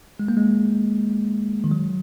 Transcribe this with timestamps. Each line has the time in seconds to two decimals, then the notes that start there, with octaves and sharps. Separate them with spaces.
0.19 G#3
0.28 A#3
0.37 G#3
1.64 D#3
1.71 F#3